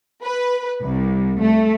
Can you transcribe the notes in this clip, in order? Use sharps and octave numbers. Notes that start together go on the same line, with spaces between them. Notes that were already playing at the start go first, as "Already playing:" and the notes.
B4
C2
A3